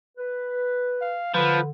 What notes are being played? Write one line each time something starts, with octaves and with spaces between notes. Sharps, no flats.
B4
F5
D3 F3 B4